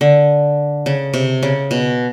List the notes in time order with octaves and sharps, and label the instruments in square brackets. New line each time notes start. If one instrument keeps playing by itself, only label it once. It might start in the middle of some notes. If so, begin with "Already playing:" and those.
[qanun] D3
C#3
C3
C#3
B2